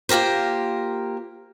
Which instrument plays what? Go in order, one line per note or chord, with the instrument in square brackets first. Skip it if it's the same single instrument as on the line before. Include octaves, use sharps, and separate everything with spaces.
[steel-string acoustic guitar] A#3 F4 G4 A#4 C5